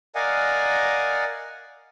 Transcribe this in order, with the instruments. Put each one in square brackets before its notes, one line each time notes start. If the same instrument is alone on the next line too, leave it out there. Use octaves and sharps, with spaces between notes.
[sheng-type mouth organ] A#4 D5 D#5 F5 F#5 G#5